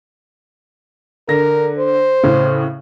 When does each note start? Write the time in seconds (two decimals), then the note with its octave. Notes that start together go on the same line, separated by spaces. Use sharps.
1.29 D3 A#4 A#6
1.78 C5
2.24 A2 C#3